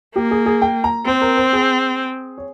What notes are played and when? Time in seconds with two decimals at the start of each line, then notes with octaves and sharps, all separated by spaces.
0.15 A#3 G4
0.31 G#4
0.46 G#4
0.62 G5
0.84 A#5
1.06 C4 C5
1.22 A#4
1.37 C5
1.53 G#4
2.38 C#5